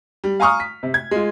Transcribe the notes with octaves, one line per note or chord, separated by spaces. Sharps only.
G3
F5 G#5 A#5 C#6 D#6 F6
B6
C3
G#6
G#3 F4